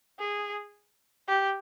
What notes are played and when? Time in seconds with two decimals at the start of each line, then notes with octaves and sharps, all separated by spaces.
0.19 G#4
1.28 G4